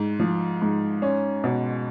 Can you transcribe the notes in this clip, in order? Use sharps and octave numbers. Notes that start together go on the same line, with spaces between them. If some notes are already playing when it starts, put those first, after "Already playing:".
Already playing: G#2
F3
G#2
C#4
B2